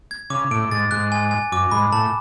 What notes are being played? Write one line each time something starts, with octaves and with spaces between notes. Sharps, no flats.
G#6
C#3 D6
A2 D7
G#2 A6
G#2 F#6
G#5
G#5
F#2 D6
G#2 B5
A2 A5